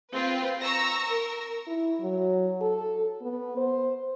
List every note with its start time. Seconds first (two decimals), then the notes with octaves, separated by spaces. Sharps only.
0.13 C4 F4 B4
0.62 A#5 C#6 E6 A#6
1.09 A#4
1.67 E4
2.00 F#3
2.61 A4
3.22 B3
3.57 C5